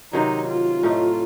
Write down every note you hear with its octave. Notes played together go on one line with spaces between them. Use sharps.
C3 D#3 F#3 D#4
F4
A2 A3 D#4